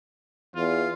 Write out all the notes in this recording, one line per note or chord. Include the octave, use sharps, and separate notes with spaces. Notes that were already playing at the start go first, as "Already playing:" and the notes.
E2 F4